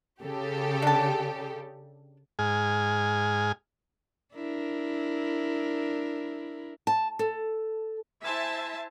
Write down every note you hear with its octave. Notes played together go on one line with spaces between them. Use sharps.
C#3 G4 A4
D4 A5
G#2 G#4 G#5 F6
D4 E4 A#4
A5
A4
E4 C5 E5 G#5 A5